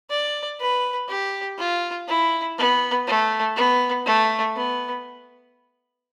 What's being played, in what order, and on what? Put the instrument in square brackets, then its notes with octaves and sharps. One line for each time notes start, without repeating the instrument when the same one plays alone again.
[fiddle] D5
B4
G4
F4
E4
B3
A3
B3
A3
B3